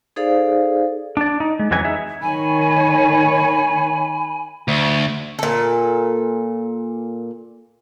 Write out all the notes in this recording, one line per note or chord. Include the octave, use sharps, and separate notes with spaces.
D#4 G#4 A4 C5 D5 F5
D4 D5
D#4
G#3
F2 C#3 E3 F#3 B3 G#5
D#4 G#4 E5
D#3 C#5 G#5 B5
D2
A#2 A4